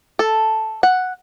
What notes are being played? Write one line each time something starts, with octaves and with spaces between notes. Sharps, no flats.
A4
F#5